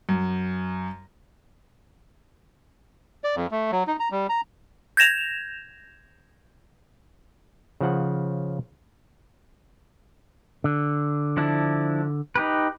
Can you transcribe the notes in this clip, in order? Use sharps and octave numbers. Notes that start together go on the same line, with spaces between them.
F#2
D5
F2
A3
F#3
D#4
A#5
G3
A#5
G6 G#6 A#6 E7 F7
C#3 F3 F#5
D3
F3 D4 E4
D#4 G4 B4